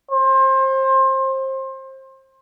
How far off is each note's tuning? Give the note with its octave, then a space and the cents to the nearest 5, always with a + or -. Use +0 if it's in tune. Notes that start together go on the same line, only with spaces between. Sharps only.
C5 +25